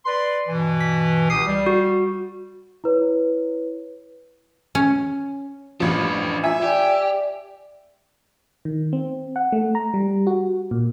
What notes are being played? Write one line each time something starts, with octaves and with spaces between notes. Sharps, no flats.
B4 D5 C6
G2 B2 E3
B6
C#2 G4 D#6 C7
G3
F#4
E4 B4 C#5
C#4
A1 F3 D4 B4
F4 E5 G#5
G4 D5
D#3
C4
F#5
A3
A#5
G3
F#4
A#2